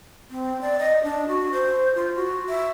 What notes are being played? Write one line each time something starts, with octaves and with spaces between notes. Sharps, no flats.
C4
D5
D#5
D4
F#4
C5
F4
F#4
E5